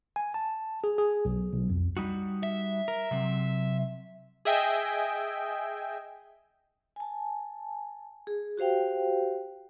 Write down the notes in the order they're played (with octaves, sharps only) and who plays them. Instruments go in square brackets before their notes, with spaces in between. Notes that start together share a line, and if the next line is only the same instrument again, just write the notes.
[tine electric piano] G#5
A5
G#4
G#4
B1
B1
F2
[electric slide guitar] G3 D#4 F#4
[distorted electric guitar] E5
[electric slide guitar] A#4
C3 F#3 C4
[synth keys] G#4 D#5 E5 G5 G#5
[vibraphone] G#5 A5
G#4
F#4 G4 C5 F5 G5